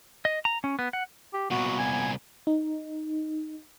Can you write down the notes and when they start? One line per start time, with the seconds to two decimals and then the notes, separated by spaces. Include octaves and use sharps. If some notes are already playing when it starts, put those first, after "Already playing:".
0.25 D#5
0.45 A#5
0.64 C#4
0.79 B3
0.93 F#5
1.34 G4
1.51 C2 A#2 B3 F#4
1.79 G#5
2.47 D#4